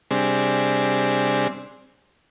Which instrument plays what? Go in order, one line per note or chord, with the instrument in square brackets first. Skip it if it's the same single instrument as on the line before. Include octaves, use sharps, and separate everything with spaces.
[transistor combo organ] C3 G3 C4 D4 G#4